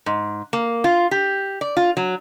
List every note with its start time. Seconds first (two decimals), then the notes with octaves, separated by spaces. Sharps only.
0.06 G#2
0.53 A#3
0.84 F4
1.11 G4
1.61 D5
1.77 F4
1.97 F#3